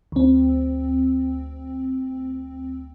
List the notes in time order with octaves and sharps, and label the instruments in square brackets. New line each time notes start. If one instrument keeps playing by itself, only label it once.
[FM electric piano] D2 C4